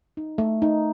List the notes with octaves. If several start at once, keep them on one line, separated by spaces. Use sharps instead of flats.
D#4
A3
D#4